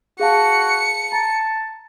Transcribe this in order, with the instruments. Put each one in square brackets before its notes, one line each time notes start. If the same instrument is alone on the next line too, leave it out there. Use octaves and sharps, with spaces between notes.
[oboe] F#4 [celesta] G#4 F5 A5 [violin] C#7
[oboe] A5 [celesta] A#5